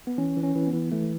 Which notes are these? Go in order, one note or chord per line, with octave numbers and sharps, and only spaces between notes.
B3
E3 C#4
E3
C#4
E3
B3
E3
E3 A3